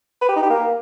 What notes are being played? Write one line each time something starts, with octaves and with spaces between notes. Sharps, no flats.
B4
G4
D#4
G4
A#3